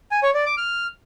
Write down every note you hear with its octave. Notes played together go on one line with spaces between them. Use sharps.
G#5
C#5
D5
D6
F6